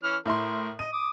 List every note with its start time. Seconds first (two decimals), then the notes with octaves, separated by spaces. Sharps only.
0.03 E3 C#4 F6
0.26 A2 E4 A#4 C6
0.79 D#5 D#7
0.93 D6 D#6